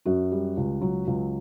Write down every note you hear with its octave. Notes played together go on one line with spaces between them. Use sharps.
F#2 F#4
G3
C#2
F#3
C#2